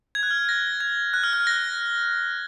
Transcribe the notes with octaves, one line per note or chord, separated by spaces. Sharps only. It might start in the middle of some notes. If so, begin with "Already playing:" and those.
G#6
F#6
F6
F#6
A#6
G#6
F#6
F6
F#6
A#6